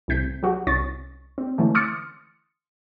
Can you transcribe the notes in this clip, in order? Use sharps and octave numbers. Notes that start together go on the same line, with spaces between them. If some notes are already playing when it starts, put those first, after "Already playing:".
C2 A2 C3 G6 B6
F#3 F#4 G4
C2 C#4 C#6 A6
C4
D3 E3 A3 C#4
C6 D6 D#6 F6 A6 C#7